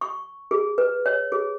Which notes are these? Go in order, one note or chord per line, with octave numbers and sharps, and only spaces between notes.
C#6
G#4
B4
C#5
G#4